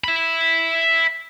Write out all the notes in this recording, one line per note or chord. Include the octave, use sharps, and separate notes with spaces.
E5 B5